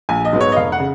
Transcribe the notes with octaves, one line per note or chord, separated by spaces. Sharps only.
A#1 G#5
D#5
G#2 F#3 B3 D#4
C#5
D#5
F1 F5
F#5
C#3